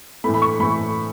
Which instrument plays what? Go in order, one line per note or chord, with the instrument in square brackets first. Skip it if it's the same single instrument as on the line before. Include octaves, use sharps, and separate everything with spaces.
[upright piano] A2 E3 A3 B5
B5
C#6
A2 E3 A3 B5